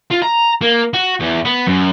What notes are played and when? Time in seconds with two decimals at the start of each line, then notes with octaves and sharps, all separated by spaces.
0.11 F4
0.23 A#5
0.62 A#3
0.94 F#4
1.20 E2
1.45 B3
1.67 F#2